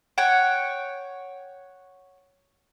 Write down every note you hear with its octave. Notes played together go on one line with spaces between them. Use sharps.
C#5 F#5 G5